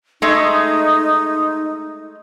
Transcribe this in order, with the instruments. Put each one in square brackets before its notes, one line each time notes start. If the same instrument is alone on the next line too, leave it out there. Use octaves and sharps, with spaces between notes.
[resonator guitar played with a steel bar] G#3 A3 [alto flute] D#4